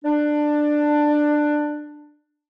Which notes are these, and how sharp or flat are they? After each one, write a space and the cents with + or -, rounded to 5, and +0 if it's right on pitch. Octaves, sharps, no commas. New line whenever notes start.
D4 +15